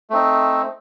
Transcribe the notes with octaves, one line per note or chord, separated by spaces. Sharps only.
A3 C4 D#4